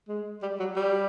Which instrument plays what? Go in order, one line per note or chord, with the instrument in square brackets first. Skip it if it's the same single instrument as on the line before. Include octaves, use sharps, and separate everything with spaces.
[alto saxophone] G#3
G3
F#3
G3